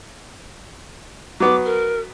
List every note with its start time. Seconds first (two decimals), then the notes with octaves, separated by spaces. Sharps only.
1.40 F#3 B3 D6
1.65 A#4